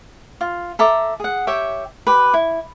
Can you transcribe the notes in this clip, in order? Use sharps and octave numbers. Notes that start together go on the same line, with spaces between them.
F4
A4 E5 A#5 D6
G#4 F#5
G4 C#5 E5 G5
G4 B4
E4